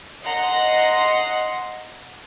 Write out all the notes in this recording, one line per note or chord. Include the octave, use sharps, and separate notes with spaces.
D#5 F#5 A#5 C6